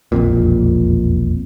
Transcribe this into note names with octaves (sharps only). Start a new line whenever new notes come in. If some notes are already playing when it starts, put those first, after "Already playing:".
E1 A#1 F2 A#2